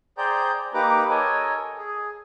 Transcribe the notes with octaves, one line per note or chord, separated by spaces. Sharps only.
G#4 C5 D5 G5 A#5 G6
A#3 D#4 G4 B4 A#5 D6
A4 A#4 C#5 D#5 G#5
G#4